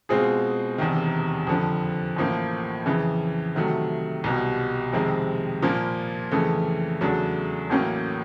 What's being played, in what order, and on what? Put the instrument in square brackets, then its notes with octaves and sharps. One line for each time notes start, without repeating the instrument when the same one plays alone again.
[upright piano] B2 G#3 C4 F4 G#4
E1 E2 C3 D#3
F2 D3 F3
A1 A2 F3 A#3
F2 C#3 E3
C3 D#3 F#3 A3
C2 B2 G3
F2 C3 D#3 G#3 C4
A#2 F3 A#3
F2 C#3 E3 A3
E2 C#3 F#3 A3 D4
A1 A2 F#3 A#3 C#4